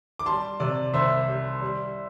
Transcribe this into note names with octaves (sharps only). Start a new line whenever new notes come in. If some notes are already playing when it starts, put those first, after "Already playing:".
D6
G3 A5 C6
C3 D5
C2 C5 E5
G3
G3